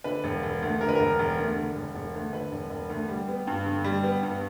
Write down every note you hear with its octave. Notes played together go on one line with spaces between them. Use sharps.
D3 B4
E1
E1
D2
D3 A#4
B4
E1 A#4
E1
D2
D3
E1
E1
D2
D3 B4
E1
E1
D2
G3
B3
G2
D3
G3
B3
G2